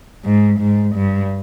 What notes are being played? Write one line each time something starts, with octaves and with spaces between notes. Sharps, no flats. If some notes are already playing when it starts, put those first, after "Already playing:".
G#2
G#2
G2